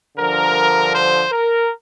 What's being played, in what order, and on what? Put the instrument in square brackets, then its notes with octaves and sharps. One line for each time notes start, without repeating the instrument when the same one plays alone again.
[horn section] G2 D3 F3 A#4
C5
A#4